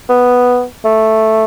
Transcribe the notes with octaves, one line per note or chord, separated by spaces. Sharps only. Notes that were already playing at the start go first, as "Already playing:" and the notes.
B3
A3